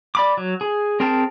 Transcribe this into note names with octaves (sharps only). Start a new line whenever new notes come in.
D5 B5 D6
F#3
G#4
C4 G#4 A#4 G5 A5